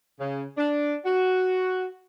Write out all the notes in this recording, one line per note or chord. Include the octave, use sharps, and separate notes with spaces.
C#3
D4
F#4